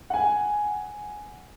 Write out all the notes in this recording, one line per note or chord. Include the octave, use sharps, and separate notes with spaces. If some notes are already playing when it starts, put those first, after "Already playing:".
F#5 G#5